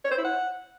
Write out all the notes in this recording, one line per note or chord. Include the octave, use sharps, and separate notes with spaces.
C#5
C5
E4
F#5